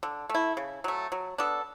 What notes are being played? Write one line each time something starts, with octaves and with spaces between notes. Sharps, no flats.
D3
A3
E4
C#3
F#3 A3
F#3
B3 D4 A4